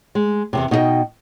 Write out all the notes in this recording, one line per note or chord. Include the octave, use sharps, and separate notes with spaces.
G#3
E2 G2 C3
B2 D#4 F4 G#4 D#5 G5